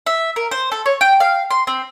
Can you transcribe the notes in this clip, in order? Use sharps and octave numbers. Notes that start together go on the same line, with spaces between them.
E5
A#4
C5
A4
C#5
G5
F5
C6
C4